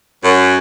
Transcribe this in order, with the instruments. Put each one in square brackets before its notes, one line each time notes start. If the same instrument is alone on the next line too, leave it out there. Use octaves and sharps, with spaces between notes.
[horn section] F#2